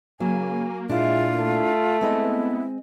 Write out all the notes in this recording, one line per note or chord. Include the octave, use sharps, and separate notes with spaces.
C#3 F#3 A#3 G#5
A#2 G#3 D4 E4 F4
A3
G#3 B3 C4 E4 D#5